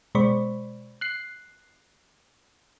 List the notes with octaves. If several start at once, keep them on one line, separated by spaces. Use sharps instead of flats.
B2 G#3 C5 D5 B5 C#6
F#6 C7